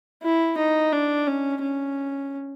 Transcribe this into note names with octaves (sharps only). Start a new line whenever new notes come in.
E4
D#4
D4
C#4
C#4